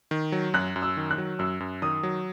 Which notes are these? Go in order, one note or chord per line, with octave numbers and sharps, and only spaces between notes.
D#3
F#3
F#2 F#6
F#2
E6
D#3
F#6
F#3
F#2 E6
F#2
D#3 D#6
F#3